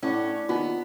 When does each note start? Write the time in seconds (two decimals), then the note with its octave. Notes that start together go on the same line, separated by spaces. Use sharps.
0.02 A2 C#4 D4 F#5
0.49 D#2 B3 D#4 F4